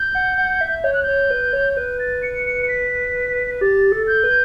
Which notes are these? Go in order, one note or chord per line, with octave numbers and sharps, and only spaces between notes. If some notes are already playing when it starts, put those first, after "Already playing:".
Already playing: G6
F#5
F#5
E5
C#5 G6
F#6
C#5 G6
B4
C#5
B4 G6
A6
C#7
C#7
C#7
B6
G4 A6
A4
G6
B4